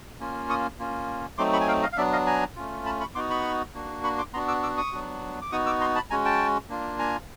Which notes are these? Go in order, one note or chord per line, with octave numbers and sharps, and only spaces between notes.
A#3 C#4 F4
C#6 D#6
A#3 C#4 F4
F#3 A3 C4 D#4 C6 D6
B5 C#6
G#5
F5 G5
D#5 F5
F5
F#3 B3 D4 D5 E5
D#5 F5
G#5 A#5
A3 C#4 F4
A5 B5
B5 C#6
B3 D#4 F#4 C6 D6
B5 C#6
A#3 D4 F#4
B5 C#6
C6 D6
B3 D4 F#4 A#5 C6
D6 E6
D6 E6
C#6 D#6
F#3 B3 D4 F#4
D6
B3 D#4 F#4 C#6 D#6
D6 E6
A#5 C6
A5 B5
G#3 C#4 F#4 G#5 A#5
G5 A5
A#3 D4 F4
G#5 A#5